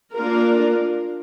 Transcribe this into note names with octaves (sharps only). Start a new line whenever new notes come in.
A#3 D4 F4 A#4